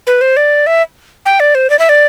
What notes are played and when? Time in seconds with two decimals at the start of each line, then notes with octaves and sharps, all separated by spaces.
0.07 B4
0.21 C5
0.37 D5
0.67 E5
1.26 G5
1.40 D5
1.55 C5
1.70 D5
1.79 E5
1.89 D5